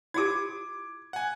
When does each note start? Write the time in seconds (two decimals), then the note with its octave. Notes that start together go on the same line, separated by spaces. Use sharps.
0.14 E4 F4 G4 D6 G#6
1.13 F#5 G#5